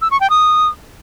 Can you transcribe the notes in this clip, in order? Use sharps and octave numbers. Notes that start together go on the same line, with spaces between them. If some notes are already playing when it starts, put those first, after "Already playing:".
E6
C#6
G5
D#6